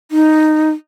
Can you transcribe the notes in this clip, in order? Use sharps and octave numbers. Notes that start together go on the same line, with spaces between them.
D#4